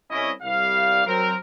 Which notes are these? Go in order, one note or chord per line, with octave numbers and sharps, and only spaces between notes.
C2 C#4 E4 D#5
C2 G3 F5
F#3 C4 A#4